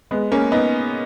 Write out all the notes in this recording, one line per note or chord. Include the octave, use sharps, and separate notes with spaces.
G#3 B3
A#3 C#4
B3 D#4